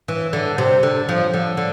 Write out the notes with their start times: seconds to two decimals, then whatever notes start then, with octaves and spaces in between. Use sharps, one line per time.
0.08 E3
0.33 D3
0.58 C3
0.83 D3
1.09 F3
1.34 D3
1.57 D3